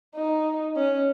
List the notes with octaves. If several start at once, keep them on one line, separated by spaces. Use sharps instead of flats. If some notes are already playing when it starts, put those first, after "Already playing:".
D#4
C#4